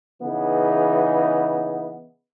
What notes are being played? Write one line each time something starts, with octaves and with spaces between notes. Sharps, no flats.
C#3 E3 B3 D#4 G#4 B4